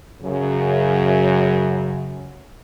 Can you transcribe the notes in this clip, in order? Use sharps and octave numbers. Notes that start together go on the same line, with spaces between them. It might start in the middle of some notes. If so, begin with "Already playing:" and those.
F#2 C#3